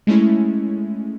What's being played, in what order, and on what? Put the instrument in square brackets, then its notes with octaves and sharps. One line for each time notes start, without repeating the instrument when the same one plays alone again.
[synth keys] G#3 A3 C#4 E4